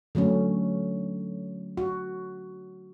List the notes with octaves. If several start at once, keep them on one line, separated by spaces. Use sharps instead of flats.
D3 F#3 A3 C#4
F#4